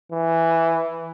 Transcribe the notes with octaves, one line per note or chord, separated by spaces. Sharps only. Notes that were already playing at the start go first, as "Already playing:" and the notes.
E3